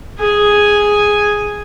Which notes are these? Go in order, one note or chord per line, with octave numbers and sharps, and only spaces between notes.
G#4 G#5